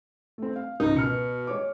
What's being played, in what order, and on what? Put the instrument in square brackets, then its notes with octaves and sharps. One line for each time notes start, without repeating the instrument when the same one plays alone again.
[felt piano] A3 C4
F5
[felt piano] C#2 G#2 A#4 [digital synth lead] D#4
[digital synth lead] B2 [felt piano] F6 C#7
[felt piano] G#3 C#5 D6